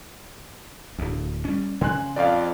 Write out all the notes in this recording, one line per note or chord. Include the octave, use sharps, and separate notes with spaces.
D1 D2
G3 C#4
C#3 G#5 C6 F#6
F2 D5 F5